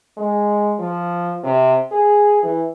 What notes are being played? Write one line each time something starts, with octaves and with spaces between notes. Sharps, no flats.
G#3
F3
C3
G#4
E3